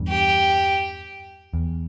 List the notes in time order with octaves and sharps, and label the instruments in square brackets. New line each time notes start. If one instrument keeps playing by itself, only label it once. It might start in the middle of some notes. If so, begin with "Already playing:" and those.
Already playing: [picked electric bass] E2 G2
[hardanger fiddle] G4
[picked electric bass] E2